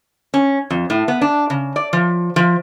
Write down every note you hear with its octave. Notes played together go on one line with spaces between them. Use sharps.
C#4
F2
A2
B3
D4
C#3
D5
F3
F3